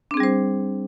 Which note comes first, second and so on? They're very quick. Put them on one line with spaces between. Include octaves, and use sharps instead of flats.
D4 C4 G#4 G3 C5